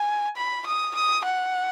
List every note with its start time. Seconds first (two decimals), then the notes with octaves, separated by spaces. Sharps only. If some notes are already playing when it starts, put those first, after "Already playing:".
Already playing: G#5
0.37 B5
0.66 D#6
0.95 D#6
1.24 F#5